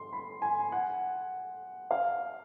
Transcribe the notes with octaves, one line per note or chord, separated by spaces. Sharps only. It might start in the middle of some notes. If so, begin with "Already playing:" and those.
Already playing: C6
B5
G#5
F#5
F5